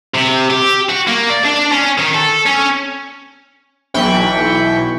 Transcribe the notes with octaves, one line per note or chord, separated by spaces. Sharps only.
C3
G4
F#4
A#3
D5
D4
C#4
D#3
A4
C#4
B1 E3 G5 B5 C#6